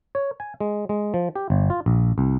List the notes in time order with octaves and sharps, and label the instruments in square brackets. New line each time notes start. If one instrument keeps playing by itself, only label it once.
[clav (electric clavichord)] C#5
G#5
G#3
G#3
F3
G4
G1
F4
A#1
C2